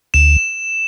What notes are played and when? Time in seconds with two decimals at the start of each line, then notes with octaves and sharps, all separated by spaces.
0.14 D2 E7